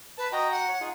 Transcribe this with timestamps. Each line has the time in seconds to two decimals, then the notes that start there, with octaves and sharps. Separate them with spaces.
0.18 B4 A5
0.32 F#4 D#5 G5 A#5
0.51 F#5
0.68 C#5
0.81 D#4 F4 G#4